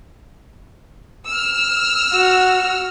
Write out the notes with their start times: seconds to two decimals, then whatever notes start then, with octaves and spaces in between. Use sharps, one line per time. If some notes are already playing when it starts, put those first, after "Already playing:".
1.27 E6 F6
2.13 F#4